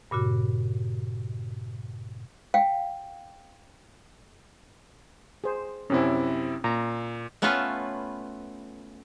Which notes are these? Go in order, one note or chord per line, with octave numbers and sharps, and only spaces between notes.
G2 A#2 C#3 F#4
F5 G5
G#4 C5
F#2 C3 C4 C#4 E4
A#2 A#5
A3 B3 C#4 F4 A4 B4